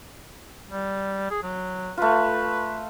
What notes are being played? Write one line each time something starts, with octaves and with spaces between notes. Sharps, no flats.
G3
G#4
F#3
A3 F4 B4